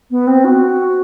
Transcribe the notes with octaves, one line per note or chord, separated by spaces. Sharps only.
B3
C4
F#4